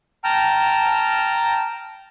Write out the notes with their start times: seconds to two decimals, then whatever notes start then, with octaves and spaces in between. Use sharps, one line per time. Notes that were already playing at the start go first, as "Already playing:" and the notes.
0.24 G5 A5 A#5 F6